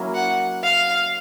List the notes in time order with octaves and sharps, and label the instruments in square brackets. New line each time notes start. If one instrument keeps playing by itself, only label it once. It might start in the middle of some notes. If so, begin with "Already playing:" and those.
Already playing: [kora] F#3 A#3 C#4 E4
[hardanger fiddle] F#5
F5